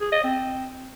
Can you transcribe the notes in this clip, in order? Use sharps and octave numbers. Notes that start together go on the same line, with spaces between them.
G#4
D#5
C4